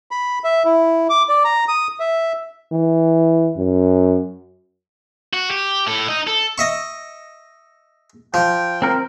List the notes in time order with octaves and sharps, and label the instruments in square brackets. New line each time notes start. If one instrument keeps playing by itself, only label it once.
[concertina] B5
E5
E4
D6
D5
A#5
D#6
E5
[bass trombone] E3
F#2
[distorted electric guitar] F#4
G4
A2 A4
D#4 D#5
A4
[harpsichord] D#5 E5 C#6
[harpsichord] F3 [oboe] G5
[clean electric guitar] C4 A#4